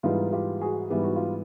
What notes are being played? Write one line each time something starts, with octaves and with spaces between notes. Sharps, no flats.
G#2 E3 G3 B3 D#4 F4
F4 G4
F#4 G#4
G#2 E3 G3 B3 G4
F#4
F4 G4